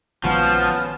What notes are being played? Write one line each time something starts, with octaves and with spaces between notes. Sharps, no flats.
A#1 D#3 F3 G#3 B3 C#4 F#4 F6